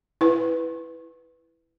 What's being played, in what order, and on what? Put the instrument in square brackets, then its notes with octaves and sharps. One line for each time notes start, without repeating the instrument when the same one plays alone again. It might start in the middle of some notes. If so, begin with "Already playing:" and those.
[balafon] E4 B4